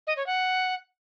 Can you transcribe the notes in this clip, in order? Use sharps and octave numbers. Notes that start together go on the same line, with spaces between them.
D#5
C#5
F#5